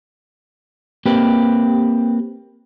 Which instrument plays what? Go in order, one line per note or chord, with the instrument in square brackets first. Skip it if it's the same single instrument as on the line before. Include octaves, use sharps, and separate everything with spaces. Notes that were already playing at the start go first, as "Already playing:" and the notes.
[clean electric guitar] A#3 C4 G4 B4